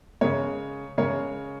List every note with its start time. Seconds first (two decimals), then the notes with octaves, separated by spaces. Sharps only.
0.21 C#3 G#3 A#4 C#5
0.98 C#3 G#3 A#4 C#5